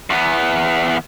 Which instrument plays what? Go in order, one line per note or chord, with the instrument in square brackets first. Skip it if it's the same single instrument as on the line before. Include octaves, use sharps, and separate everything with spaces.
[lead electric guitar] E2 B3